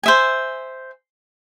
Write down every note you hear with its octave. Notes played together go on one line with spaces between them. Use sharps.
C5 E5 G#5